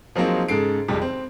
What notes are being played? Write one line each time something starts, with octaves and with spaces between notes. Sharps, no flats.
F3 F#3 G#3 A#3 C4 D#4
G#2 C#3 A4 C7 D7
G#1 F2 C3 G3 G#3
C4